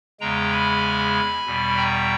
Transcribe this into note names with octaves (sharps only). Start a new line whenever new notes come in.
E2 C#3 G#3 G5 A#5
G#5 B5
E2 B2 G3
G5 A#5